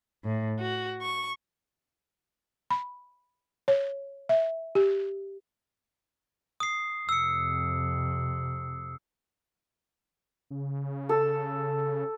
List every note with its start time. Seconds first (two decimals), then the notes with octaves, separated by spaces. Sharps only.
0.25 A2
0.58 F#4
1.01 C#6
2.70 B5
3.68 C#5
4.29 E5
4.75 G4
6.60 D#6 C7
7.09 F2 C3 E6 C#7
10.51 C#3
11.09 A4